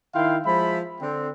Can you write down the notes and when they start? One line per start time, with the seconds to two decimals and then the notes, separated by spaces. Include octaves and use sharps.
0.14 D#3 E4 F5 G5 C6
0.45 F3 G#3 E5 B5
1.01 D3 C4